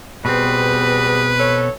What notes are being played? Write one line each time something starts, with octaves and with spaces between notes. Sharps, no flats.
B2 G3 B3 C4 G#4 B4
A4 C#5